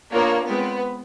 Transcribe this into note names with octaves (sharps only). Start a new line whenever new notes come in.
A#3 B3 D4 F4 A#4 C#5
G#3 B3 C4 F4